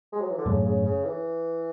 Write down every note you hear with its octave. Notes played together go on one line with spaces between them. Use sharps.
G#3
F#3
E3
D3
F#2 A2 C#3
C#3
C#3
E3